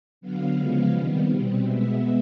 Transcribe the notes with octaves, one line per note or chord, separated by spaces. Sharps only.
D3 F#3 B3 F5
C#3 F3 G#3 B3 F5
C3 D#3 G3 B3
B2 G3 C4
B2 G#3 B3 E5